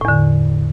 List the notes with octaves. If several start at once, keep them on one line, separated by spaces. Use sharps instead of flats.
E2 A2 D3